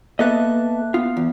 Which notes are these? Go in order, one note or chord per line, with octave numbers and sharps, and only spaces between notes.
A#3 B3 A4 D#5 E5 F#6
B3 F4
E2